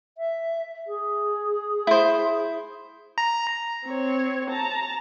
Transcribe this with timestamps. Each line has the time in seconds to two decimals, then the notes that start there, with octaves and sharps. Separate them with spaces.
0.18 E5
0.87 G#4
1.87 E4 C5
3.18 A#5
3.86 C4 C#5
4.50 A5 A#5